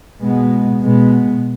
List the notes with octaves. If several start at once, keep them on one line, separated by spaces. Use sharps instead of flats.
B2 G#3 B3
B2 G#3 B3